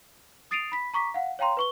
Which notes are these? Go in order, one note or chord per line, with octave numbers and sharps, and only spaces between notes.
D#6 A6 C7 D7 D#7 F7
B5 B6
A#5 C#6 D6 B6
F5 F#5
C#5 F5 G5 A#5 C6
B4 C#6 G7